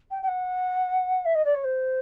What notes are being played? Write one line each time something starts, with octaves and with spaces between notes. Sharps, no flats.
G5
G5
F#5
E5
D#5
D5
C#5
C5